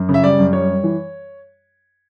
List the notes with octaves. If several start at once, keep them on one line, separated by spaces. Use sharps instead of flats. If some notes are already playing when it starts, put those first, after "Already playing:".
Already playing: F#2
C#3
E5
G3 D5
F#2
G3 C#5
G3
E3